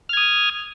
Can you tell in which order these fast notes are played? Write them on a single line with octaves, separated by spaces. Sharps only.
F6 G#6 D#6